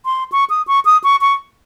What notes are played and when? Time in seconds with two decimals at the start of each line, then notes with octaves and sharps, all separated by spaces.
0.05 C6
0.32 C#6
0.50 D#6
0.67 C#6
0.85 D#6
1.04 C#6
1.21 C#6